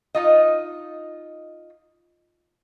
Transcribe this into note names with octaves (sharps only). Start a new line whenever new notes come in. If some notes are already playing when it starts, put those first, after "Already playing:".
D#4 F4 D#5